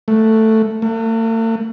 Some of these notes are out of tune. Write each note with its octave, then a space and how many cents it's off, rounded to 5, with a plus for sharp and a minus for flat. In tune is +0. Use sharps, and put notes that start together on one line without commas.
A3 +5
A3 +45